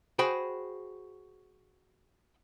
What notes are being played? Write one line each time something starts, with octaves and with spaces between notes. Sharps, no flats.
F#4 G#4 C5 G5 G#5 B5